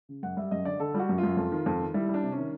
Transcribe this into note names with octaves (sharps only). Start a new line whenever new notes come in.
C#3
F#2 F#5
G3 E5
F#2 D#5
D3 D5
D3 A4
G3 F4
F#4
F#2
F4
F#2
F2
D#3
F2
D#3
G3 E4
G3
D4
C3
C#4
D#3